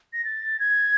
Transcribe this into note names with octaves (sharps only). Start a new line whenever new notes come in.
A#6
A6
G#6